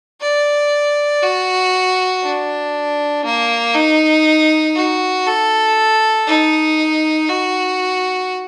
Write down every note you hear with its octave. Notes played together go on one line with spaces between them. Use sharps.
D5
F#4
D4
A#3
D#4
F#4
A4
D#4
F#4